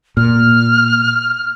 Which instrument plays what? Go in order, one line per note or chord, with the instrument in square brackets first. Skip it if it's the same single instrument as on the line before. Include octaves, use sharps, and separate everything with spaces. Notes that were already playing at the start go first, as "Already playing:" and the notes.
[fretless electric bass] A#2 [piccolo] F6